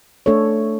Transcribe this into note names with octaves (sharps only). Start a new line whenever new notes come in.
A3 D4 A4 C#5